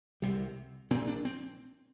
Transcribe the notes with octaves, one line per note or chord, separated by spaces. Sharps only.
C2 C3 G3
A#1 A#2 C4
D4
C4